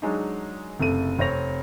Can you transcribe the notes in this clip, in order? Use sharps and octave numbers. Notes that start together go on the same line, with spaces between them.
F#3 G#3 D4 D#4
F#1 C3 A3 A4 D#7
F1 C4 C#5 A#6 F7